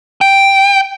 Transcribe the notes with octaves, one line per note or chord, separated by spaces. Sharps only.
G5